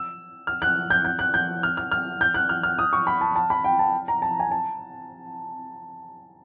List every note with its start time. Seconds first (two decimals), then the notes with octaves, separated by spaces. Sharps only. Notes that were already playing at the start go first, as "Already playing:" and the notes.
Already playing: E6
0.47 F6
0.62 F#6
0.90 G6
1.05 G6
1.19 F#6
1.34 G6
1.63 F6
1.77 F6
1.91 F6
2.21 G6
2.34 F#6
2.49 F6
2.63 F6
2.79 D#6
2.93 C#6
3.07 B5
3.21 A5
3.36 A5
3.50 B5
3.64 G5
3.79 A5
4.08 A#5
4.22 A5
4.40 G#5
4.51 A5